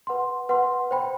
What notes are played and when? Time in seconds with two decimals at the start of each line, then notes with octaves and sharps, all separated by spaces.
0.07 B4 F#5 C6
0.49 B4 F#5 C6
0.91 C5 G5 B5